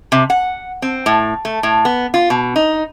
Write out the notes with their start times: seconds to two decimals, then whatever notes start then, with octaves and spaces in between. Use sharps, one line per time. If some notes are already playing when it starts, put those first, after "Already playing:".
0.12 C3
0.30 F#5
0.82 C4
1.06 A2
1.45 A3
1.63 A2
1.85 B3
2.14 F4
2.30 B2
2.56 D#4